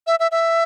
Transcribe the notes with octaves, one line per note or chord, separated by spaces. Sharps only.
E5
E5
E5